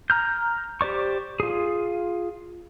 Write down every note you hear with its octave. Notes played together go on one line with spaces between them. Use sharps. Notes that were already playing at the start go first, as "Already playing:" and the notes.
A#5 F6 G6
G4 C5 D5 C#6
F4 G#4